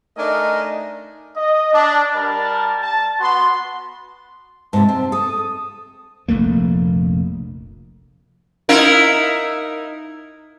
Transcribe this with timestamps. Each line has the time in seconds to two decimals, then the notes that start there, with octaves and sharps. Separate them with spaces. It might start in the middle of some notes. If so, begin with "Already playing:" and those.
0.18 A3 D4 D#4 A#4 D#5 G#5
1.36 D#5
1.72 D4
2.15 G3 A#4 D5 A5
2.82 A5
3.20 B3 F#4 C6
4.73 G#2 C3 A5
4.89 C4
5.12 A4 D#6
6.28 F1 A#1 A3 A#3
8.69 D#4 E4 A#4